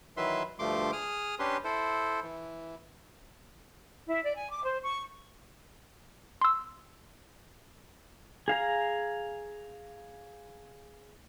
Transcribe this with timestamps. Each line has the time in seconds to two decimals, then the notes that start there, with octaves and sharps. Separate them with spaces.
0.17 D#3 E3 F#3 B4 E5 C6
0.59 D2 G2 F3 A3 C6 D6
0.93 G#4 D#6 F6
1.39 C#4 D4 G4 B4 C6
1.64 E4 A4 C5
2.23 E3
4.07 E4
4.23 D5
4.35 G#5
4.51 D6
4.64 C5
4.83 C#6
6.41 C6 E6
8.48 G#4 F5 A#5